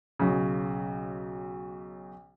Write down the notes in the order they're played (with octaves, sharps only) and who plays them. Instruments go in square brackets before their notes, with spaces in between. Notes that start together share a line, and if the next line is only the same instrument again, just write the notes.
[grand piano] B1 C#3